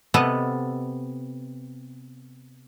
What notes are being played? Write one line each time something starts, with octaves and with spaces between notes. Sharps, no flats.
C3 B3 A4 D#5 A5